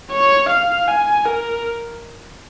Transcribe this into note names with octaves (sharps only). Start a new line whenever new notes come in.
C#5
F5
G#5
A#4